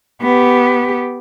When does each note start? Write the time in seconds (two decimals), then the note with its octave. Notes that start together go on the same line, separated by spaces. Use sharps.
0.22 B3 G4